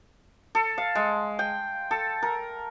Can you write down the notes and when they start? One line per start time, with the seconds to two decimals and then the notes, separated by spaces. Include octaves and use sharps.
0.55 A4
0.78 F5
0.95 G#3
1.39 G5
1.91 A4
2.23 A#4